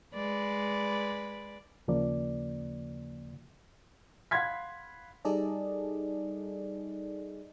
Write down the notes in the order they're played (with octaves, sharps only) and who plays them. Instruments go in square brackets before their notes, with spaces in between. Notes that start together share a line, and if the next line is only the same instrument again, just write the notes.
[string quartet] G#3 B4 D5
[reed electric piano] D#2 C#3 F3 A#3 D5
[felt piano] F5 F#5 B5 C6 G#6 B6
[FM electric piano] G3 D#4 G#4 A4 D5 D#5